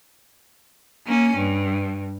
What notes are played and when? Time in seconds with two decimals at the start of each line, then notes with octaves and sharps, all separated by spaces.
1.06 A#3 C#4
1.37 G2